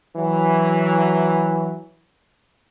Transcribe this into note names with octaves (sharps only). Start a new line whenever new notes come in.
E3 F#3